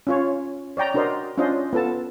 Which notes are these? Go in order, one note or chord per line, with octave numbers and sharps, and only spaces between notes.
C#4 F4 C#5
C#5 D5 G5 A#5
D4 F#4 A#4 C5 D5 D#5
C#4 D4 F4 C5 D#5
B3 F4 A4 A5